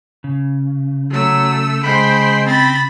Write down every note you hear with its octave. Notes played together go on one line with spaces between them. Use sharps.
C#3
F#3 A3 E6
G#3 C5 G5 B5
C4 B5 A6